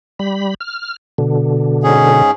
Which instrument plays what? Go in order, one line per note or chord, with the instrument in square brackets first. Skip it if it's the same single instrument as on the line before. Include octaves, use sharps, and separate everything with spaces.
[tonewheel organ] G3 B5
F6
B2 D3
[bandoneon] G#2 C#4 G#4